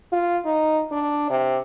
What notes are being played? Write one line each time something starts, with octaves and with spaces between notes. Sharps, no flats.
F4
D#4
D4
C3